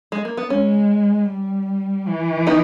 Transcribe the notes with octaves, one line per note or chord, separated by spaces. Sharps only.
G#3
A#3
B3
G#3 C#4
G3
E3
B3 D#4